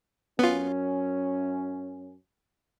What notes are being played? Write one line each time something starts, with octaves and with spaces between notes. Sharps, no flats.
F#2 B3 C#4 F4